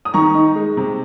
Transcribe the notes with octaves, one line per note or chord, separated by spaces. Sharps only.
D#6
D#3 A#5 C#6
D#4
G#3
C3